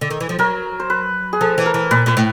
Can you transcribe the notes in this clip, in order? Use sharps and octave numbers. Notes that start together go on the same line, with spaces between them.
D3
D#3
E3
F3
F#3 A#4
C5
B4
G#4
F3 A4
E3
A#4
E3
A#2 B4
A#2 B4
A2